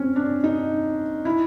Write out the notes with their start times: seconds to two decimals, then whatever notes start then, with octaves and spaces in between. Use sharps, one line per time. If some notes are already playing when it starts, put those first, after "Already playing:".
Already playing: C4 C#4
0.16 D4
0.44 D#4
1.25 E4